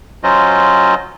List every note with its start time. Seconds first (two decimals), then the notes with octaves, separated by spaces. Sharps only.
0.24 F#3 C#4 F4 C5 D#5